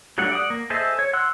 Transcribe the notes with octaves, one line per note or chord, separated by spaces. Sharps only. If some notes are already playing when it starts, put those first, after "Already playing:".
F#3 G3 A3 D4 F#5
D5 F#5 D#6
A#3
G#4 A4 C5 D#5 E5
C#5
F#5 C6 E6 F#6